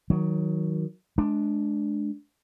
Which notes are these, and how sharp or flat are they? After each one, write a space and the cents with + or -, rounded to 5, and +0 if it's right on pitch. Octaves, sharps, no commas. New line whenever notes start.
D#3 +25 F#3 +0
G#3 +35 D4 +5